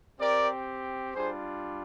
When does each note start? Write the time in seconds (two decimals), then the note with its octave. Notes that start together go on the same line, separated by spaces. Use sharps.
0.21 C4 G4 A#4 D5
1.14 G3 D4 F4 G#4 C5